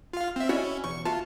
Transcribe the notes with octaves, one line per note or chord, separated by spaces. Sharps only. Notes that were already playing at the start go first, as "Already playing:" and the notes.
F4 F5
C4 E5
C#4 E4 F#4 D5 D#5
B1 E2 C#6
F4 F#4 E5 A5